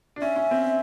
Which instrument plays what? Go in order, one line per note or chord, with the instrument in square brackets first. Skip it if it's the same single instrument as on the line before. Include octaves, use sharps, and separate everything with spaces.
[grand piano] D4
[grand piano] C#4 [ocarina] E5
[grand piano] C#4
C4